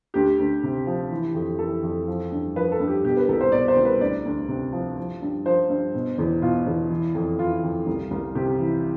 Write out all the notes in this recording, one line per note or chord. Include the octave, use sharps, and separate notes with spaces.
D2 G4
D2
C3
F3
E3
F2
E3 A4
F2
F3
G2
F3 B4
A4
G2
G4
B2 G4
B4
C2 A4
C5
B2 D5
C5
C2
B4
D2 D5
D2
C3
F3
F3
G2
F3 C5
G2
B2
E2
B2 F4
E2
E3
F2
E3 F4
F2
C2
C2
C3 G4
E3